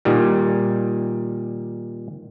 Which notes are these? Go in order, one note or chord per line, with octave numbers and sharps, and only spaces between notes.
A#2 D#3 G3